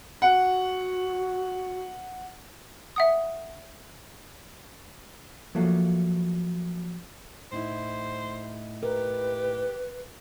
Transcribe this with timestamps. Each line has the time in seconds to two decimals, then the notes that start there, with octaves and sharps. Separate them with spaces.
0.22 F#4 F#5
2.96 E5 F#5 D#6
5.55 F3 F#3 A3 A#3
7.52 A2 D#4 E4 C5
8.83 G4 A#4 B4